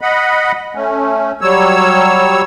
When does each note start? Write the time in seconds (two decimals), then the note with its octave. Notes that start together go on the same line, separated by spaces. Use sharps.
0.01 D#5 F#5 B5
0.75 A3 C#4
1.41 F#3 G3 C#5 E6